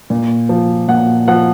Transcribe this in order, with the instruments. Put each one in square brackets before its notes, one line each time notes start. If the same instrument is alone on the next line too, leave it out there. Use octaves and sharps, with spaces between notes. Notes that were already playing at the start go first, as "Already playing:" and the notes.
[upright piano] A#2
F3
A#2 F#5
F3 F#5